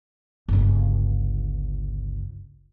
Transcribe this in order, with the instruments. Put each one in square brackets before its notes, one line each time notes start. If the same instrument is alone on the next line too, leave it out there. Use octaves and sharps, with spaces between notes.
[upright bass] G1 C#2